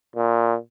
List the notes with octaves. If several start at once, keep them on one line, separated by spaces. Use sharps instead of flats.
A#2